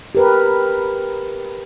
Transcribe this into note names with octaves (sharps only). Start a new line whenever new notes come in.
G4 A#4 B4